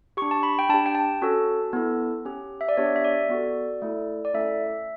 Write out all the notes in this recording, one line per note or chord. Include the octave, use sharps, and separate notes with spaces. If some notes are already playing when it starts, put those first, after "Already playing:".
D4 G4 C#6
A5
B5
G5
D4 G4 A5
G5
A5
C#4 F#4 A4
B3 E4 A4
C#4 G4
E5
D5
B3 D4 G4 C#5
E5
D5
B3 F#4 A4
A3 E4 A4
D5
A3 C#4 E4 A4 E5